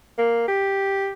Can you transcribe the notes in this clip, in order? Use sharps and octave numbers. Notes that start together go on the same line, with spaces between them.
A#3
G4